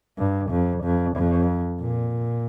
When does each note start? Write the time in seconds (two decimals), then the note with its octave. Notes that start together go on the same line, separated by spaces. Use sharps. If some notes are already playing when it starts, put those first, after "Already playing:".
0.18 G2
0.50 F2
0.83 F2
1.16 F2
1.80 A#2